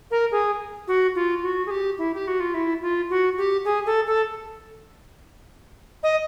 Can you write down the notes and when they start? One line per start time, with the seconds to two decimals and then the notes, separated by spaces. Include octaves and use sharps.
0.11 A#4
0.32 G#4
0.88 F#4
1.15 F4
1.43 F#4
1.66 G#4
1.71 G4
1.98 E4
2.14 G4
2.28 F#4
2.40 F4
2.54 E4
2.82 F4
3.10 F#4
3.38 G4
3.65 G#4
3.86 A4
4.07 A4
6.03 D#5